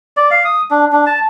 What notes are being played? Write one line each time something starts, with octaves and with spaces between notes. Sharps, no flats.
D5
F5
D#6
D4
D4
A5